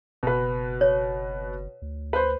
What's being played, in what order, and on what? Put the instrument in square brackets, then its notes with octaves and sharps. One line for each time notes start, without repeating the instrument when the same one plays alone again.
[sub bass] F#1 [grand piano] B2 B4
[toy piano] C#5
[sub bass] D2
[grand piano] B4 C5